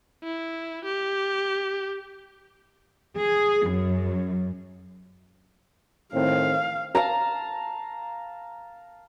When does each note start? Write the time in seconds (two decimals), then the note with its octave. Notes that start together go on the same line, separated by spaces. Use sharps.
0.24 E4
0.85 G4
3.17 G#4
3.69 F#2
6.14 A2 D#3 C4 F5
6.95 F5 A5 A#5